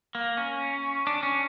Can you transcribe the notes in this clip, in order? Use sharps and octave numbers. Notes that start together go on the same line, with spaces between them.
A#3
C#4
D4
C#4